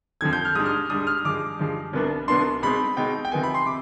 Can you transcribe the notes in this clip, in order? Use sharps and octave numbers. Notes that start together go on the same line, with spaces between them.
F2 D3 F3 G#6
G6
F6
G#2 G3 D4 D#6
F6
G#2 G3 D4 D#6
F6
G2 F3 G#3 D6
G2 F3 G#3
C2 B2 B3 D4
C2 B2 B3 D4 C6
B2 G#3 C4 D#4 B5
B2 G#3 C4 D#4 G5
G5
C3 F3 B3 D#4 G#5
B5
C6
C3 D6